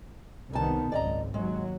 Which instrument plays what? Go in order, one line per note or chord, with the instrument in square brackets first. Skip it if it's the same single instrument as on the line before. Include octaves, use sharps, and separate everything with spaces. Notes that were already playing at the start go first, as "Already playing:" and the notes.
[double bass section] C2 D#3 B3 [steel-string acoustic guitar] D#4 A5
[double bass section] G#1 C#2 F#2 [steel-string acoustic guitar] D5 D#5 A#5
[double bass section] D#2 F#3 [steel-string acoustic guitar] G#3